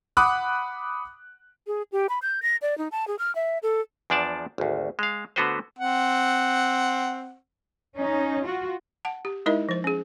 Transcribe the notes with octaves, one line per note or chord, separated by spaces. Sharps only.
F#5 B5 D6 D#6 F#6
G#4
G4
B5
G6
A#6
D5
D#4
A5
G#4
F6
E5
A4
E2 F3 D4 D5 A5
G#1 D2
G#3 F5
D3 A3 B3 F#4 B4 C5
C4 F#5
C#4 D#4
F4 F#4
F#5 A5
G4
G#3 D#4 E4 A#4 D#5 E5
F3 C5
C#4 G#4